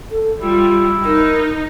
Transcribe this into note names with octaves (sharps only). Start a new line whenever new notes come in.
A4
G3 E4 F4
D#4 A#4